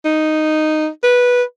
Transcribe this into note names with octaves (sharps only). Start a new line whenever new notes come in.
D#4
B4